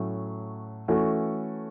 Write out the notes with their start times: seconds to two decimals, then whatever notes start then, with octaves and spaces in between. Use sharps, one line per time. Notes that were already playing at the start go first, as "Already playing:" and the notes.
Already playing: A2 F#3 A3 C#4
0.88 E3 A3 C#4 F#4 A4